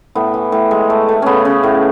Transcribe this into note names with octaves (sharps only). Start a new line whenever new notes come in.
A2 B3
E3
A2
G#3
A3
A3
C#3 B3 C#4
C#3
A2